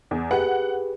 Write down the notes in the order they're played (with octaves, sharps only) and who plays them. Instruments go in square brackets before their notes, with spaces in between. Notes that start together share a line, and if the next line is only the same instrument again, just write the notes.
[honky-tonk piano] E2
[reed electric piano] G4 G#4 B4 [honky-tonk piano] F#5